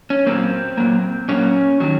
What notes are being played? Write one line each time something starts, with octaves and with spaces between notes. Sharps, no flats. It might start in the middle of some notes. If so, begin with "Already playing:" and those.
C#4
A#2 F#3 A#3 C4
A#2 F#3 A#3
A#2 F#3 A#3 C#4
D#3 F#3